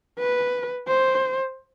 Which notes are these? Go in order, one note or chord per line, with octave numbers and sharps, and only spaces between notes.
B4
C5